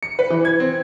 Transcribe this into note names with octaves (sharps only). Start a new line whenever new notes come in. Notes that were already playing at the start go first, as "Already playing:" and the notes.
C#7
B4
E3
G#6
C4